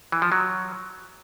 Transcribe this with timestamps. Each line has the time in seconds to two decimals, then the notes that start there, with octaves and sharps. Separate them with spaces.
0.12 E3
0.22 F3
0.32 F#3